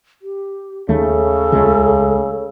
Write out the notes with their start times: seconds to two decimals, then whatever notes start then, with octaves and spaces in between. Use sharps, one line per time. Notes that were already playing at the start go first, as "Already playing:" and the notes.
0.22 G4
0.89 D#2 C#3 A3 A4
1.52 C#2 G#3 A3